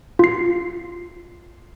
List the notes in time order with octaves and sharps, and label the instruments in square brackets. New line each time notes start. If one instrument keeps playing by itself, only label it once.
[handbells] F4 C7